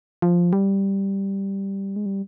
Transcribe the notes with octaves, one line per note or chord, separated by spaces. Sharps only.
F3
G3
G#3
G3